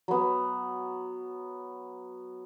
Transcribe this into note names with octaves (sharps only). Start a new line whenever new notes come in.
F#3 B3